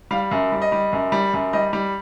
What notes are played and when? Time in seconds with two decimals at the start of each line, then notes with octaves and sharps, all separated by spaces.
0.11 G3 F5
0.31 F#2
0.52 G3
0.62 D#5
0.72 G3
0.93 F#2
1.12 G3
1.33 F#2
1.53 G3 D#5
1.73 G3